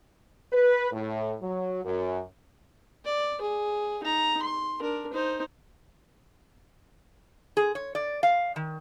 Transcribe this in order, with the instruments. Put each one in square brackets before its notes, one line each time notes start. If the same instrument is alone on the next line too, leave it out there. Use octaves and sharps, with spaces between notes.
[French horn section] B4
A2
F#3
F#2
[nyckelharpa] D5
G#4
D#4 A#5
C6
D4 A#4
D#4 C5
[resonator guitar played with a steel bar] G#4
C#5
D5
F5
D#3